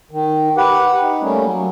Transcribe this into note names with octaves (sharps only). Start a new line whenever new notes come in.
D#3
G4 B4 F#5
D#4
G3 A3 A#3 C#4
F#3